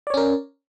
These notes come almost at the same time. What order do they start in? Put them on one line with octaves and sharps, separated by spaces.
D5 C#5 C#4 A#4